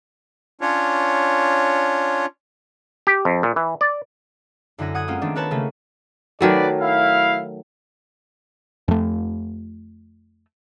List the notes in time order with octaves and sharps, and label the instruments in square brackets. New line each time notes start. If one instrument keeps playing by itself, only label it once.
[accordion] C#4 D4 F4 C#5
[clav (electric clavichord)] G4
F2
A#2
E3
D5
[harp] F#2 D3 E4 F#5 G#5 A#6
F#5 D#6 G#6
G#3 A#3 C4 C#4 F4
D#3 A3 C4 D4
B3 A#4 B4 C#5 A5 B5
C#3 A3 A#3 C#4
[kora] D#3 F#3 A3 [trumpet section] D#4 B4 D5
[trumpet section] E4 F5
[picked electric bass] F2 A3